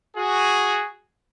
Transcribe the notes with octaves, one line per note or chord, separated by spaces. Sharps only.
F#4 G#4